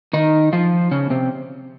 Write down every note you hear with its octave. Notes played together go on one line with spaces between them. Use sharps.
D#3 D#4
F3 F4
C#3 C#4
C3 C4